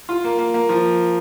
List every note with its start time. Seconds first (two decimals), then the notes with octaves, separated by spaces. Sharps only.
0.09 F4
0.24 A#3
0.39 A#3
0.54 A#3
0.69 F3